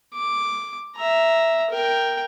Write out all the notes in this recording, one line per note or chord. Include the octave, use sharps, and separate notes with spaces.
D6
E5 A#5
A#4 G5